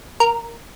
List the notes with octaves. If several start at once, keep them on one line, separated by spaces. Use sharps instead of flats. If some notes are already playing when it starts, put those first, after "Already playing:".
A#4